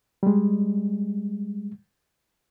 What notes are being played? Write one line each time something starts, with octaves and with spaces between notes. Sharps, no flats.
G3 G#3